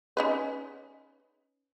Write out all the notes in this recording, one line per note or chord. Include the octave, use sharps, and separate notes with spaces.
C#4 D#4 B4